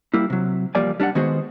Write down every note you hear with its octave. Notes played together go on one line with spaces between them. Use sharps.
G3 A#3 E4
C3 F#3
E2 F3 G3 A#3 D5 G#5
G3 D4 D5 F#5
D#3 G#3 B3 F#4 G#4 C5